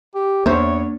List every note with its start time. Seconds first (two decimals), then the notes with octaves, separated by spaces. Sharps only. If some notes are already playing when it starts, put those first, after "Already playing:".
0.15 G4
0.46 E2 A#3 C#4 D4 C5 C#5 E5